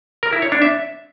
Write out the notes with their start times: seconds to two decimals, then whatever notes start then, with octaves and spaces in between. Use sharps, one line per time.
0.23 A#4
0.33 E4
0.42 C#5
0.52 D4
0.62 E5